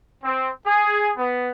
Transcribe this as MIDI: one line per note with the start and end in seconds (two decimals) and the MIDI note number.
0.24 0.50 60
0.66 1.11 68
1.18 1.51 59